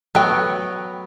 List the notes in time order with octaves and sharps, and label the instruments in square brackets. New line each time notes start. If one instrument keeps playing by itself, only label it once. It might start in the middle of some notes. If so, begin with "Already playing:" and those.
[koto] F#3 B3 C#5 [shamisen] A3 G5